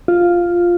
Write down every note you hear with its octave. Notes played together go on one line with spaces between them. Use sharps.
F4